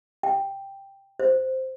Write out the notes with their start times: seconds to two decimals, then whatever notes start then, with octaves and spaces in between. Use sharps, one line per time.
0.23 G5
1.20 C5